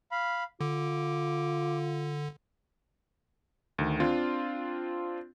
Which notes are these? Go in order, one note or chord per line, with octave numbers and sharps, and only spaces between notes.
F5 B5
D3 F4 D6
D2 D#3
C4 D4 F4